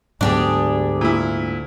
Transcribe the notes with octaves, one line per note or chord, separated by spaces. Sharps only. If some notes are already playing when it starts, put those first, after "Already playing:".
D2 G#2 F#3 B3 D4 G4 G#4
A#2 E4